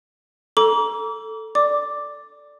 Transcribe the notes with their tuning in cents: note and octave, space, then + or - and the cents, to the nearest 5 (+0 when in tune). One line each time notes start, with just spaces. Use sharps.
A4 +5 A#5 +25 D6 -35
D5 +0 D6 +0